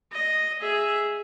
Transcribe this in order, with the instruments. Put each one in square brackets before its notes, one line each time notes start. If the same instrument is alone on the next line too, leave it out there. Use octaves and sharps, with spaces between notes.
[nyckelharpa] D#5
G#4 E5